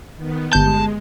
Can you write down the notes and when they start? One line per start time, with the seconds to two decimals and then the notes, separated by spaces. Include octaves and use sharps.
0.16 D#3 B3
0.53 G1 G#3 A5 G6